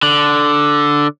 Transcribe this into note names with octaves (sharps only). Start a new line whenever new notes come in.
D3